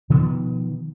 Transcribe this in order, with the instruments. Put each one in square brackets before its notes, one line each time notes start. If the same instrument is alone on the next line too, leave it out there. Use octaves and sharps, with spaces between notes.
[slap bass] B2 D#3 F3 B3